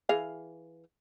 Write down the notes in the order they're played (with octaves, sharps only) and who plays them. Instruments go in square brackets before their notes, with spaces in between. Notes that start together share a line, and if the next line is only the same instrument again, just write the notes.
[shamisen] E3 G#4 F5